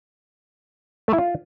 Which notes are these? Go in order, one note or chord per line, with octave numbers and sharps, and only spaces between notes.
A3
E4
F4